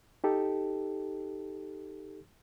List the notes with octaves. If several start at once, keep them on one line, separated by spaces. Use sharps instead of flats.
D#4 G4 A4